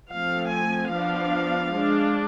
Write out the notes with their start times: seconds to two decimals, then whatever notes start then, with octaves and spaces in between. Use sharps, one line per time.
0.11 F3 A3 C4 F5
0.52 G#5
0.93 F3 B3 D4 F5
1.75 G#3 D4